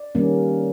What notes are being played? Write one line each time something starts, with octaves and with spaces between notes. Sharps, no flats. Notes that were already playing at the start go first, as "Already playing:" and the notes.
Already playing: D5
D#3 G3 A#3 C#4